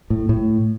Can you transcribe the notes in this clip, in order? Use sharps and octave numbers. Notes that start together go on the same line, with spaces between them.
A2
A2